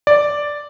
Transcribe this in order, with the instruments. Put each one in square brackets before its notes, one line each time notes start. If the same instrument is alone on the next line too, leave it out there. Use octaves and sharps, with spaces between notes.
[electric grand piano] D5